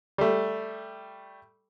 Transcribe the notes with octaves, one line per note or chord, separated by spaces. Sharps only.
G3 A3